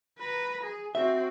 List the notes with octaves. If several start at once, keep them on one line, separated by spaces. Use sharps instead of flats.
B4 A#5
G#4
C4 F#4 E5